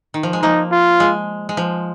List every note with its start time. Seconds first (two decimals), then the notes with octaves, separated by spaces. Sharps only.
0.14 D#3
0.23 F3
0.33 G#3
0.42 F3 A#3 D#4
0.72 F4
1.00 G#3
1.49 G#3
1.57 F3